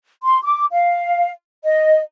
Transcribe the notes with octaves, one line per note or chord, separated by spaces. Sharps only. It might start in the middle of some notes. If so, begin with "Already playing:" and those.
C6
D6
F5
D#5